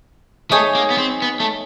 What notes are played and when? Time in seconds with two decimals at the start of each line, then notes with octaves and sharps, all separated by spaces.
0.51 A3 D#4 G#4 C#5
0.75 A#3
0.91 B3
0.98 C4
1.22 B3
1.40 A3